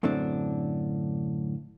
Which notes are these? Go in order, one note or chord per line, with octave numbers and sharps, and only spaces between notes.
F#2 A2 D3 C4 D4